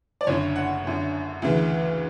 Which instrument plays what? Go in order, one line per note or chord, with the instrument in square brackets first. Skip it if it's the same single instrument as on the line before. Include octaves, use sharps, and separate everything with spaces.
[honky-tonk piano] D5
F#1 F#2 D3 C#5
F#5
F#1 F#2 D3
D2 C#3 E3